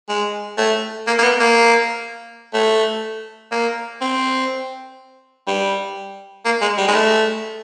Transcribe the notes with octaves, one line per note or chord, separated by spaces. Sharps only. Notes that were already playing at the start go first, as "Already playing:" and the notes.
G#3
A3
A#3
A#3
B3
A#3
A3
A#3
C4
G3
A#3
G#3
G3
G#3
A3